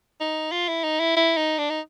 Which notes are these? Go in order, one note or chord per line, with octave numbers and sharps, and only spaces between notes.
D#4
F4
E4
D#4
E4
E4
D#4
D4
D#4